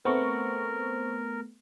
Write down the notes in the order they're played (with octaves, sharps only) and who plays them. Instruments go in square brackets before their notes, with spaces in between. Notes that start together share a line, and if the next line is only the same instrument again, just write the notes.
[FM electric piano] A3 B3 [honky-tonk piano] C4 C#6 [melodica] A#4